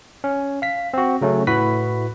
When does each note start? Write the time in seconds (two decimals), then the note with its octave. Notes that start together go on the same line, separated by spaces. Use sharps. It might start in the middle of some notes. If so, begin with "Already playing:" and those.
0.24 C#4
0.62 F5 B6
0.94 C4 F#4
1.21 C#3 F#3 A3 C#4
1.47 A2 E4 F#4 B4 B5 B6